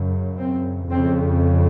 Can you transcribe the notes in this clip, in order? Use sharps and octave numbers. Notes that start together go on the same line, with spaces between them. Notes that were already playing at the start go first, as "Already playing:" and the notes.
Already playing: F#2 C#3
C4
F2 C#3 C4